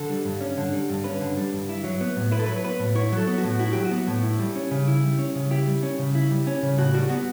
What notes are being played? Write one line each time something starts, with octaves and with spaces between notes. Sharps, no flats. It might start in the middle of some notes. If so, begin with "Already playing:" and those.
Already playing: D3 A4
G3
G2
C#4
D3
G3
G2
C#4 B4
D3
G3
G2
E4
F#3
B3
A2
E4 B4
A4
F#3 B4
B3 B4
A2
E4 C#5
F#3 A4
B3
F#4
A2
E4 F#4
F#3 G4
F#4
B3
A2
E4
G3
C#4
C#3
E4
G3
C#4
C#3
E4 G4
G3
C#4
C#3
E4
G3
C#4
C#3
A2 F#4
G3 F#4
B3 F#4